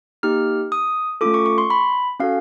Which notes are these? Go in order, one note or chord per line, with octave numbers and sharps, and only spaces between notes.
A#3 D#4 G4 F6
D#6
A3 C#4 F4 A4 D6
C#6
C#6
C6
B5
C#4 F#4 A4 F5